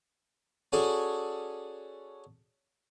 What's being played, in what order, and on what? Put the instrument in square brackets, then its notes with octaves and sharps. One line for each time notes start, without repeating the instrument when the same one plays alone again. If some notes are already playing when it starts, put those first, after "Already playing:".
[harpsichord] C#4 F#4 G#4 A4 D5